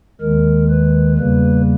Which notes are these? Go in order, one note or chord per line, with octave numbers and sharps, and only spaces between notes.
D#2 D#3 G#3 A#4
B4
E2 C#3 G3 A#3 B4